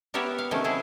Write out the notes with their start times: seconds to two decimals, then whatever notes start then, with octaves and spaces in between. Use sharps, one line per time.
0.14 B3 G4 A#4 C#5 E5 F#5
0.38 F5
0.51 C3 D#3 F3 F#3 A3 C#4
0.64 F#3 E4 G#4 A4